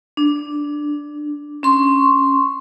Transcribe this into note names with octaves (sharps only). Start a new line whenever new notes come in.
D4
C#4 C6 C#6